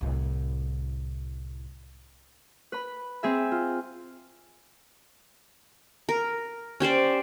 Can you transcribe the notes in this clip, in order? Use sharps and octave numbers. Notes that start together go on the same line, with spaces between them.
C2 A2
B4 B5
C4 G#4 E5
F4
A#4
C#4 G4 C5 D5